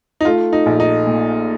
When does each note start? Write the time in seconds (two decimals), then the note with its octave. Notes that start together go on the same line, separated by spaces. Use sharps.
0.21 D#4
0.25 A3 F4
0.53 D#4
0.66 A#1
0.80 D#4
1.07 A#2